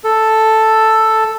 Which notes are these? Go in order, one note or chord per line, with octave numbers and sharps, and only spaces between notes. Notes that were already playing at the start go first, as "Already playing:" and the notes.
A4